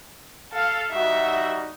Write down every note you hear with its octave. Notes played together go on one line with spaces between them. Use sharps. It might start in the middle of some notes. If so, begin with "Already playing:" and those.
A4 F5
G3 D#4 F#4 E5